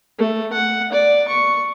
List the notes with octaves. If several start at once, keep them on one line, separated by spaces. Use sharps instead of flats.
A3
F#5
D5
C#6